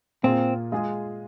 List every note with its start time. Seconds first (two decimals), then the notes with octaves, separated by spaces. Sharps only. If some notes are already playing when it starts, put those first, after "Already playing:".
0.23 A#2 A#3 C4 F4 G#4
0.72 G#3 F4 G#4